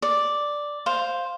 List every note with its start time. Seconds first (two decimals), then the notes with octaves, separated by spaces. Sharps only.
0.02 D5
0.86 C5 F5